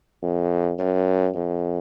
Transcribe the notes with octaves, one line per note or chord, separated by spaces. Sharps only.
F2
F#2
F2